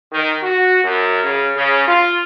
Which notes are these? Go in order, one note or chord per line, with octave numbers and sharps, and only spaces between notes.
D#3
F#4
F#2
C#3
C#3
F4